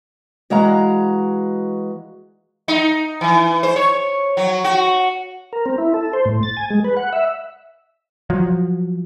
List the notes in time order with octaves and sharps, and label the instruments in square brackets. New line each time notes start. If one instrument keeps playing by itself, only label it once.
[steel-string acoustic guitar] E3 G#3 F#4 F5 A#5
[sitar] D#4
E3
C5
C#5
F#3
F#4
[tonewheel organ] A#4
C4
E4
A4
C5
A2
A6
G#5
G#3
B4
F#5
E5
[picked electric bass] F3 F#3